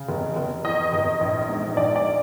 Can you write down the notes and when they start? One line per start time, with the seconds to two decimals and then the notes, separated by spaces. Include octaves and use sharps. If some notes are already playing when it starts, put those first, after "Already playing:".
Already playing: C#3
0.09 F1
0.36 F1
0.65 E2 D#5
0.93 F1
1.21 A#1
1.49 G#2
1.77 A#1 D5
1.96 D5